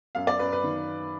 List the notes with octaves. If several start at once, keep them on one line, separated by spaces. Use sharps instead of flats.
F#2 F5
D5
F#2 B4
B4
D#3